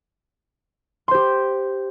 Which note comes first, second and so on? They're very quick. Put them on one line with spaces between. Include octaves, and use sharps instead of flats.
C6 C5 G4